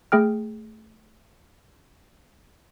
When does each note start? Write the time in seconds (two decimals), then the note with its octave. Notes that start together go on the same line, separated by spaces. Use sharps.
0.12 A3 G#4 G5 F6